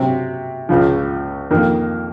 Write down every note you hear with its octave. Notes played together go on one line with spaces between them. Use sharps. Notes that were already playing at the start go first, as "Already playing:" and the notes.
Already playing: C3 F#3 C4
C#2 C#3 F3
F2 D#3 A#3